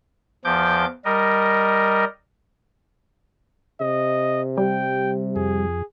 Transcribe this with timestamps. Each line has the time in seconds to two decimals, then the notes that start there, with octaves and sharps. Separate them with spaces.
0.45 E2 F3 D6 G6
1.05 G3 A#4 D#5
3.80 C3 D#5
4.57 G3 G5
5.36 F2 G#4